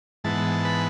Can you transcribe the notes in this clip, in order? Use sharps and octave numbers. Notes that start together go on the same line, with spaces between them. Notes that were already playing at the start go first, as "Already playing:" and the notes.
G#2 E3 B3 A5
B4